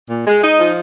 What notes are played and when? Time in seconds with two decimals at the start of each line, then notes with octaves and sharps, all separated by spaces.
0.10 A#2
0.27 G#3
0.43 D#4
0.60 F3